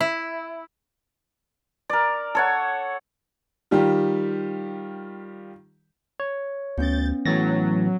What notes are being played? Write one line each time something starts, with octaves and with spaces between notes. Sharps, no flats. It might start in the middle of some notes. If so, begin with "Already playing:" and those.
E4
A#4 D5
A4 C#5 F#5
D#3 G3 F4 G4
C#5
D2 B3 C#4 G6 A6
A2 E3 F#3 A6 A#6